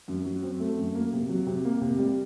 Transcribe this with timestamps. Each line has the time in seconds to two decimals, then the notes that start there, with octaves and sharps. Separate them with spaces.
0.08 F#2
0.25 F#3
0.43 C4
0.60 A3
0.78 F#2
0.95 A#3
1.13 C3
1.29 F#3
1.46 C3
1.65 A#3
1.81 C3
1.99 G3